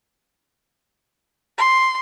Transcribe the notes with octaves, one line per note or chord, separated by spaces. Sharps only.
C6